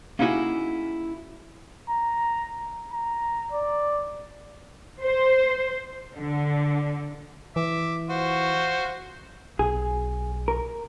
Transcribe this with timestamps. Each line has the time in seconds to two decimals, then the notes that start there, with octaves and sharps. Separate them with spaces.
0.19 A#3 C#4 D#4 E4 F#4 G#4
1.90 A#5
2.93 A#5
3.52 D5
5.01 C5
6.15 D3
7.56 E3 E5 D6
8.10 F4 F#4 C5
9.59 B1 G#4
10.48 A#4